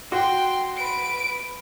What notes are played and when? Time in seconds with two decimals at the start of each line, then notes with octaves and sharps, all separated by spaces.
0.12 F#4 G5 C6
0.77 B4 D7